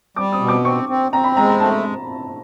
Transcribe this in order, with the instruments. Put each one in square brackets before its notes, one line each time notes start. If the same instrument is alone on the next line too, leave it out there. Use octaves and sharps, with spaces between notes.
[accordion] G3 [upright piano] D6
[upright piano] D#6
[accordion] B2
[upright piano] D6
[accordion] C4 [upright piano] C#6
[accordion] C4
[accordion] C4 [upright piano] A#5
[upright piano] B5
[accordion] G#3 [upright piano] A#5
[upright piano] A#5
[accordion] A3 [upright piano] A5